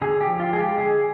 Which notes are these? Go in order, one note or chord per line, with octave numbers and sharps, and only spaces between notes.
D3 G#4
G4
F3
F4
G#3 G#4
G4
D3 G#4